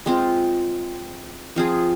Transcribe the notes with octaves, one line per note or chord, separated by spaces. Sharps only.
G#3 C4 F4
F3 C4 F4 G#4